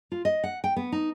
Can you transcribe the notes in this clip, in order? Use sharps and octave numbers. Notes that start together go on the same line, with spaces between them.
F4
D#5
F#5
G5
B3
D#4